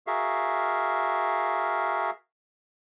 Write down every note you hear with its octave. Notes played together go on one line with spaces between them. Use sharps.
F#4 G#4 A#4 E5 F5